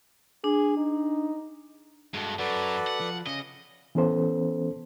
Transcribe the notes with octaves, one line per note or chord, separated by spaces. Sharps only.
D4 G#4
D#4
G2 G#3 F#4 A4
F#2 F#4 A4 B4 D5
F#5
F3
C#3 C#4 D#5
E3 B3 C#4 A4 C5